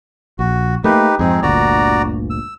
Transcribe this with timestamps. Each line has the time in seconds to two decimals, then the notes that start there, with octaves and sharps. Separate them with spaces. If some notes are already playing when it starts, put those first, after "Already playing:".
0.39 A#1 F#4
0.84 A3 A#3 D#4 G4 B4
1.19 F2 G#2 C4 D#4 G#4
1.43 G1 D2 A#2 F#4 D5 A#5
2.30 E6